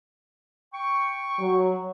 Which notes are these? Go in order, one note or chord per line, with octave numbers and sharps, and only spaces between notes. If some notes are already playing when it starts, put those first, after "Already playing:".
G5 C#6
F#3